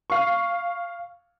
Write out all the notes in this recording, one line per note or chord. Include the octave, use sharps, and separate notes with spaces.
F5 C#6